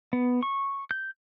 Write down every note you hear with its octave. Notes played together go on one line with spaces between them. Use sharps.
B3
C#6
G6